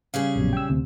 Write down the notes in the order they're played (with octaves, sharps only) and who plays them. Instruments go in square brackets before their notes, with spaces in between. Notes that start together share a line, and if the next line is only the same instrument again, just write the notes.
[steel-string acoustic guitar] C#3 G3 G#4 [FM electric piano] F5
[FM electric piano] A#1 F#2 B2
G5 E6
D2 C3